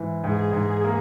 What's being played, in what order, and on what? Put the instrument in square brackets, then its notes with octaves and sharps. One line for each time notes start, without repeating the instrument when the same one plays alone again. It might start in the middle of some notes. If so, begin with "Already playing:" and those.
Already playing: [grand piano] G#2 E3 E4
[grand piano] G#2 [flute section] G#4
[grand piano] G#2
A#3